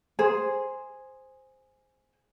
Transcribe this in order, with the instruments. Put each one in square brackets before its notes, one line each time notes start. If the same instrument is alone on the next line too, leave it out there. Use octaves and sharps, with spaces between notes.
[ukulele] G#4 C5